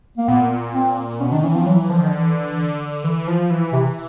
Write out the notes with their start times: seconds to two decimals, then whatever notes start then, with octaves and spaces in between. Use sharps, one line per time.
0.18 A#3
0.28 A#2 B3
0.74 C4
1.20 B2 C#4
1.31 D#3 D4
1.43 E3 C#4
1.54 F3 C4
1.66 E3 F#3
1.89 D3 F3
1.99 D#3
2.08 D3 E3
3.04 E3
3.27 F3
3.50 E3
3.73 C3